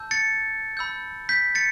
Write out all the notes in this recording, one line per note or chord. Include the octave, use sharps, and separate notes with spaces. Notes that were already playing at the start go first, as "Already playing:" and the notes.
Already playing: A5 E6 G6
A6 C#7
B5 E6 G6
G6 B6
A6 C#7